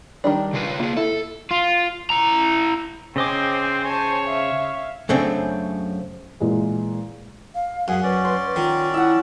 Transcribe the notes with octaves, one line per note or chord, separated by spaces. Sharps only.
D#3 G3 D4
C#3 F4 B4
A#3 F4 G#4
E4 A4
F4
E4 A#5
C#3 C4 C5 D#5 G5 G#5 D6
C#5 G#5 A5
E5 F5
F#2 C#3 A3 C4 D4
A#2 E3 G#3
F5
F#2 G#4 F#5
C#4 B4 D5
C6
D#3 F4
E4 E5 F#5